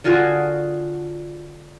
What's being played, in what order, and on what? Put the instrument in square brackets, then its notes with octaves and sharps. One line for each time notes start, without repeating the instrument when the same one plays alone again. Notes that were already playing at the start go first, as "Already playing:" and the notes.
[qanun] D3 F4 F#4 G#4